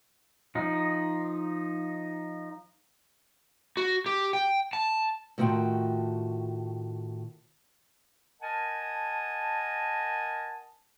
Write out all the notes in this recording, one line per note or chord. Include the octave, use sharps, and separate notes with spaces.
F3 D#4
F#4
G4
G5
A5
A2 D#3 F4 F#4 G5 A5
A#4 D#5 F#5 G#5 A5